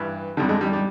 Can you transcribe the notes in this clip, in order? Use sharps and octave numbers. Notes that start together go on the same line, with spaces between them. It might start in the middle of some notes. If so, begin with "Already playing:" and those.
Already playing: G2 E3
F2 D3 G3
G#3
G3
G3